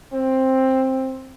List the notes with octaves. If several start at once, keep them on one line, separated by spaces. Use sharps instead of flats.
C4